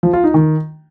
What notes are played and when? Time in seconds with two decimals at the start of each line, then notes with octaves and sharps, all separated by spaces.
0.03 F3
0.13 F4
0.24 D#4
0.34 D#3